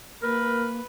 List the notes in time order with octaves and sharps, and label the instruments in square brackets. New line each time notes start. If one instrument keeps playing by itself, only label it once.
[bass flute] A#3 [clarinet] A#4 [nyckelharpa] B4